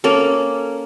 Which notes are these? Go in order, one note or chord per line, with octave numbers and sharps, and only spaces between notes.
A#3 C#4 A4